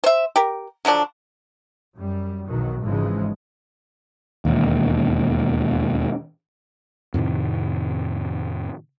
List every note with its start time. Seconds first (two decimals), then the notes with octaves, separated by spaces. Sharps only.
0.04 C5 E5
0.36 G4 A#4
0.85 D3 F3 F#3 D4
1.94 F#2 G3
2.48 B1 E2 B2 D#3 F#3
2.81 G#1 G#2 C#3 E3 F3 G#3
4.45 E1 D#2
7.14 F2 A2 C3 D#3